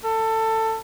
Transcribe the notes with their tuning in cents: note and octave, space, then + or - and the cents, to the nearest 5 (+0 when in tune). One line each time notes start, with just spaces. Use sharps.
A4 +20